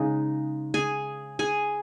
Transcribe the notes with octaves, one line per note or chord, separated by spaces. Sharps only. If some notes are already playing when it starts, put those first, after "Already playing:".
Already playing: C#3 G#3 D#4
G#4 G#5
G#4 G#5